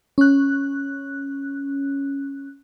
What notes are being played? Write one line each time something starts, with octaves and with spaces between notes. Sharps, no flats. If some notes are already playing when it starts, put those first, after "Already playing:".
C#4 F#6